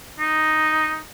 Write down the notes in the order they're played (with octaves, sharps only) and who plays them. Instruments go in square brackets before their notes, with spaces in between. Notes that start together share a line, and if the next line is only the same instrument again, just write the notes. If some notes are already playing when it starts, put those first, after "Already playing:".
[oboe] D#4